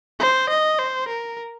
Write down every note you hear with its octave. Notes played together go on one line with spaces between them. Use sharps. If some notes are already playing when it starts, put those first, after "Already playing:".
C5
D#5
C5
A#4